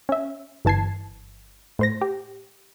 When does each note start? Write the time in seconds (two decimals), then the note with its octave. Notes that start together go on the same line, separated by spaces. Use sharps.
0.09 C#4 E5
0.65 G1 E3 A5 G#6 C7
1.79 A2 C5 A#6
2.01 G4